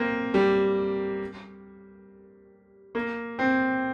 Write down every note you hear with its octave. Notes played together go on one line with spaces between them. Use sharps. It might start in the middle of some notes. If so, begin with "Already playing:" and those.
Already playing: A#3 C4
G3
A#3
C4